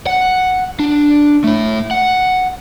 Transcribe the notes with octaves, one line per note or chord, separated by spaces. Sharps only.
F#5
D4
A3 E4
F#5